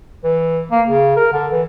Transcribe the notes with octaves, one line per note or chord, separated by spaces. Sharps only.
E3
A#3
C#3
A#4
D3
E3